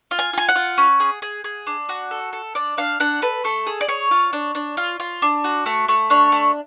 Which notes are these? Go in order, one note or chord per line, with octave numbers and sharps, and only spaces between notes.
F4
G#5
F4 G#5
F#5
F4
C#4
G#4
G#4
G#4
D4
F#4
A4
A4
D4 D5
D4 F5
D4 F#5
A4 B4
A3 A4
G#4
D5
G#4 C#5
F4
D4
D4
F4
F4
D4
F#4
A3
A3
D4 C#5
A3